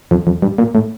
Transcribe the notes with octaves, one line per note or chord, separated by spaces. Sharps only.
F2
F2
G2
A#2
A2